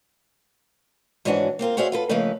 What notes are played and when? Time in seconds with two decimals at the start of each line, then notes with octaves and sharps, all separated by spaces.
1.25 G#2 E3 F3 C#4 D4 F#4
1.59 A#3 C4 F4 A#4
1.77 F#4 G#4 C5 D5 E5 F5
1.92 F4 A4 B4
2.09 C#3 F3 A3 A#3 D#4 B4